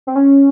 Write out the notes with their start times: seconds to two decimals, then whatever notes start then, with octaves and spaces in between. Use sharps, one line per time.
0.07 C4
0.16 C#4